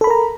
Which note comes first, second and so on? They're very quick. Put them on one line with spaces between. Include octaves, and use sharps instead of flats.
A4 B5 A#4 A#5